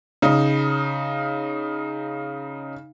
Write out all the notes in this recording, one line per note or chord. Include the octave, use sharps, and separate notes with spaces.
C#3 D#4